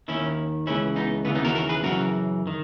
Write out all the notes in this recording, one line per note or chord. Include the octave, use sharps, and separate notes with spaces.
D#2 D#3 C#4 E4
C#2 C#3 E3 C#4 E4
B3 D#4
D#2 C#3 E3 G#3 B3
B3 D#4
F#4 A#4
F#4 A#4
G#4 B4
F#2 C#3 E3 F#4 A#4
D#3